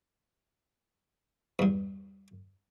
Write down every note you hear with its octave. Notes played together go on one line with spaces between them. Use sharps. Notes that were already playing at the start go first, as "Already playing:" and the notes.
E2 G2